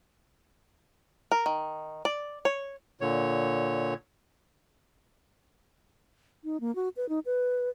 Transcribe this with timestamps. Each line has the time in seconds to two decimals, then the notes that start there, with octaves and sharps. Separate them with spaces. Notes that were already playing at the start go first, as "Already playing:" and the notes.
1.32 A#4
1.46 D#3
2.05 D5
2.45 C#5
3.01 A#2 D3 C#5
6.44 D#4
6.60 A#3
6.75 F#4
6.97 B4
7.09 D#4
7.26 B4